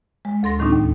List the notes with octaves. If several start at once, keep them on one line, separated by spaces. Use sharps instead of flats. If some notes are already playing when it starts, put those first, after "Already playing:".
G#3
D2 A4 C6 A#6
A2 D#3 F#3 C4 D4 D#4
D#2